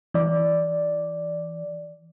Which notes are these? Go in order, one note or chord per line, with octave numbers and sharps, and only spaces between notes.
E3 D5